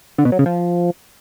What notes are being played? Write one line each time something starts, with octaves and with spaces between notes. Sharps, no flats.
D3
B2
F#3
C#3
F3